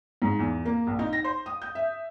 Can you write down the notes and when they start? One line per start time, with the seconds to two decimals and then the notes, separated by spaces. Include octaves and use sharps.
0.22 G#2
0.39 E2
0.65 A#3
0.87 A#1
0.99 D#4
1.13 A#6
1.24 C5
1.46 D#6
1.62 G6
1.75 E5